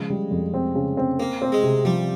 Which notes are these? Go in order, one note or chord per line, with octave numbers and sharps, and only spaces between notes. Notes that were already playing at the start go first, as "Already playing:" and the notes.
Already playing: C#3 F3 G#3
G3
F2
C4
C#3
C4
A#3 C4
C4
G#3
C3
F3 G3